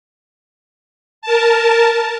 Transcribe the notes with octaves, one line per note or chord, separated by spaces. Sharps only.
A#4 A5